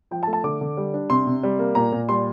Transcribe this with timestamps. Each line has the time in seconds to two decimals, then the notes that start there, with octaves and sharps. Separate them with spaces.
0.11 F3 G5
0.23 A5
0.27 A3
0.33 A5
0.44 D3 D6
0.61 D3
0.77 G3
0.94 D4
1.10 C3 C6
1.27 C3
1.43 G3
1.59 A#3
1.75 A#2 A#5
1.92 A#2
2.09 G3 C6